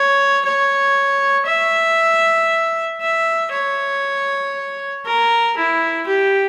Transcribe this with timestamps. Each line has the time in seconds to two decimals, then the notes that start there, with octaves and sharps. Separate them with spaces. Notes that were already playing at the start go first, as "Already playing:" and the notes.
Already playing: C#5
0.45 C#5
1.46 E5
3.01 E5
3.52 C#5
5.05 A#4
5.57 E4
6.07 G4